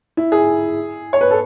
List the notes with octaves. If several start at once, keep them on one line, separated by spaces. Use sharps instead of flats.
E4
G#4
C#5
B4
A4